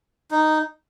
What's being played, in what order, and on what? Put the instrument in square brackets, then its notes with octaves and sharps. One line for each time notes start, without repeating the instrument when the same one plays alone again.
[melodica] D#4